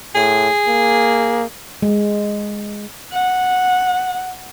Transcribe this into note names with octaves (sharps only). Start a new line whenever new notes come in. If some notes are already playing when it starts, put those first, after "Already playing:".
A2 G#4
A#3
G#3
F#5